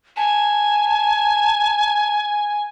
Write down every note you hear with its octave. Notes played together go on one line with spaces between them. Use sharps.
G#5 A5